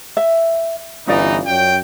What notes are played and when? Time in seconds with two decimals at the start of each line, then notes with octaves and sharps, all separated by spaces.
0.17 E5
1.07 G1 E3 C#4 D#4 F4 D5
1.47 F#2 C#5 G5